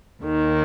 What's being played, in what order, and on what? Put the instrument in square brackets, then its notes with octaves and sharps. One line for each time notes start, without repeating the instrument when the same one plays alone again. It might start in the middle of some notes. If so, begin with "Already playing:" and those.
[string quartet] D#2 D#3